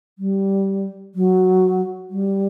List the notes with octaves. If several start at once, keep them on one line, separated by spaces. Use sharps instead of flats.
G3
F#3
G3